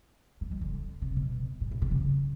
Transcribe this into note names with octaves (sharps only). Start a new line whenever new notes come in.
A3
G#3
D3
C3
B2
A#2
A2
B2
C#3